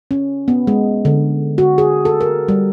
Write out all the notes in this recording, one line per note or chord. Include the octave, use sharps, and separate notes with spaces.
C#4
B3
G#3
D3
F#4
G#4
A4
A#4
G3